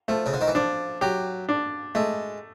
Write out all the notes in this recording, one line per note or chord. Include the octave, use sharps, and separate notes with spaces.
F3 A3
C#3
D3
D#3
E3
F3 D4
F#3 G4
D4
G#3 A3